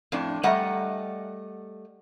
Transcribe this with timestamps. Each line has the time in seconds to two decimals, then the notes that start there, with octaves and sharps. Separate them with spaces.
0.12 F2 A2 D4
0.43 G3 A3 D#5 F#5 A#5